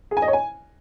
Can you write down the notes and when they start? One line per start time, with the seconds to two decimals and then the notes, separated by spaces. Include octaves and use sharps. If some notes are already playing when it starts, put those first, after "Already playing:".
0.11 G#4
0.17 G#5
0.22 D#5
0.28 C#5
0.33 G#5